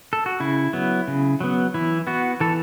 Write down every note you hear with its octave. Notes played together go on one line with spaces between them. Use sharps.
A4
F#4
C#3 E4
F#3 B3
C#3
F#3 B3
E3 E4
B3 F#4
E3 A4